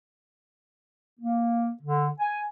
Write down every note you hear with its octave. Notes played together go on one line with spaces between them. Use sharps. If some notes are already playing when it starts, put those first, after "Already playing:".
A#3
D3
G#5